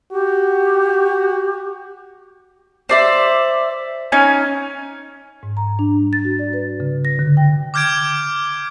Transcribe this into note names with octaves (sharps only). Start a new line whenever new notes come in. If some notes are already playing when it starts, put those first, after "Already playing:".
F#4 G4
C5 D5 E5
C#4 D#4 G#5
G#2
A#5
D4
G3
A6
F#4
D5
B4
C#3
A#6
D3
G5
D6 F6 G6 G#6 D7